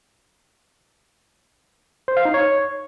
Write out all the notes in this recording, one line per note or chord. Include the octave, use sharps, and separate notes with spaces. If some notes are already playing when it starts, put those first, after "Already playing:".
C5
F5
D#4
C#5